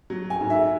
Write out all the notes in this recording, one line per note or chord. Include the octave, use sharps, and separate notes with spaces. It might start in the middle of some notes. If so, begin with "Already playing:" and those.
F#3
G#5
G#2
E5